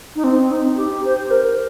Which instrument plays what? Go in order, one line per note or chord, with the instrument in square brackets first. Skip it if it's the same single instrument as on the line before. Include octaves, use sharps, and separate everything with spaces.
[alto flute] D#4
C4
D#4
G4
C5
A#4